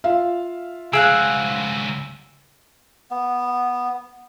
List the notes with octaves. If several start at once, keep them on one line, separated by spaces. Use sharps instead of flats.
F4 E5 F5
C#2 C4 G#4 F5 F#5 E6 D7
B3